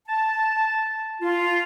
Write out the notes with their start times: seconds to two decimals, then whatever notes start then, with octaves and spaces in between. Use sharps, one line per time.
0.07 A5
1.22 F4